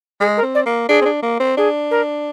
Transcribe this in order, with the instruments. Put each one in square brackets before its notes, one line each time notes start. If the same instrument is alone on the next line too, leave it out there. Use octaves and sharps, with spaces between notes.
[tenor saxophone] G#3 [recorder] G#4
[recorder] A#4
[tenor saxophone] C4
[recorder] D5
[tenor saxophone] A#3
[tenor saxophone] D4 [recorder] G#4
[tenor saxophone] C4
D4
A#3
C4
[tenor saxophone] D4 [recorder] G#4
[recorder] A#4